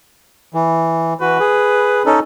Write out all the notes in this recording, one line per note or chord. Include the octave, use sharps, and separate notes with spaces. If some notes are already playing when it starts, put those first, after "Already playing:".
E3
E3 F#4 B4
G#4
C#4 D#4 A4